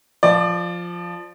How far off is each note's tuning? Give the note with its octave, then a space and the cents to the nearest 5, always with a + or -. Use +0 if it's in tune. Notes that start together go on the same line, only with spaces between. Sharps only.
F3 +0 D5 +20